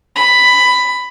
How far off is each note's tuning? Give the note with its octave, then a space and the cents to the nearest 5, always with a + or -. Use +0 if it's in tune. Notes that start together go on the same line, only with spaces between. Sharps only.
B5 +10